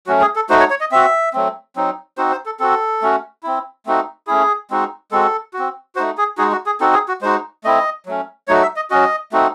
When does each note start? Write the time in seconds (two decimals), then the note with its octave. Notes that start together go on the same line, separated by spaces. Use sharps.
0.07 F#3 A3 C#4 F#4
0.21 G#4
0.36 A4
0.49 A3 D#4 F#4 C5
0.60 C#5
0.70 C#5
0.80 D#5
0.92 C4 F#4 E5
1.33 F#3 A3 C4
1.76 F#3 C4 D#4
2.17 C4 D#4 F#4 C5
2.31 C5
2.46 A4
2.59 C4 F#4 A4
3.02 A3 C#4 F#4
3.43 C4 E4
3.86 A3 C4 D#4 F#4
4.27 A3 C#4 E4 G#4
4.71 G#3 C4 D#4 F#4
5.11 G#3 C4 F#4 A4
5.54 F#4
5.59 C4
5.95 A3 D#4 F#4 C5
6.18 G#4
6.38 G#3 D#4 F#4 G#4
6.52 F#4
6.66 G#4
6.80 C4 D#4 F#4 A4
6.94 G#4
7.08 F#4
7.22 G#3 D#4 F#4 C5
7.64 A3 C4 E4 D#5
8.06 F#3 A3 C#4
8.48 F#3 A3 D#4 F#4 C#5
8.62 E5
8.76 D#5
8.90 F#3 C#4 F#4 D#5
9.32 A3 C4 D#4 F#4